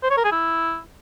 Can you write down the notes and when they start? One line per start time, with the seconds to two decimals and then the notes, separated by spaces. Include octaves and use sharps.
0.03 C5
0.10 C#5
0.18 A#4
0.25 G#4
0.32 E4